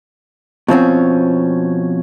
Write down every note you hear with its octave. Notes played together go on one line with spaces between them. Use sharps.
B2 F3 C4 C#4